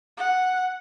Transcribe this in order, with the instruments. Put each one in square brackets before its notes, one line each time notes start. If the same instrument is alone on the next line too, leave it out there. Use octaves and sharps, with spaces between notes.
[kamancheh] F#5